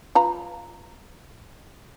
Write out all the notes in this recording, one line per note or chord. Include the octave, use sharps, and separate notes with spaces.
F4 B4 A#5